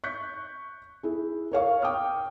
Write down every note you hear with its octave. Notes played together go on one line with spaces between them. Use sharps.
C#6 F#6 G6 B6
E4 G#4
A#4 C#5 F5 C#6
G5 D6 D#6 F6